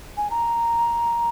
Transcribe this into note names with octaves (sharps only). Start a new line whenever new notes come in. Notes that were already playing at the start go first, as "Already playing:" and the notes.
G#5
A#5